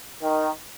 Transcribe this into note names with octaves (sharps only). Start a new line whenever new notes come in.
D#3